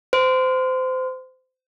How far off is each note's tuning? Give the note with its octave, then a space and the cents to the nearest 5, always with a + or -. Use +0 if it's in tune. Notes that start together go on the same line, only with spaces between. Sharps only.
C5 -25